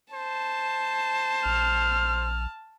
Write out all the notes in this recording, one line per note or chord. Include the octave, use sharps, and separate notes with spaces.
C5 A5
A#1 F6